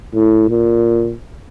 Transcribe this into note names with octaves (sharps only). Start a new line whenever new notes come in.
A2
A#2